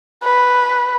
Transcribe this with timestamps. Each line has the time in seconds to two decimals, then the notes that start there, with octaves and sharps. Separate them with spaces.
0.23 B4